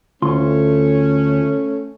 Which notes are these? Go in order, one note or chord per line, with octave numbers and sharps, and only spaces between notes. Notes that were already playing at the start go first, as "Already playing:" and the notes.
D2 A3 C#4 F4 C6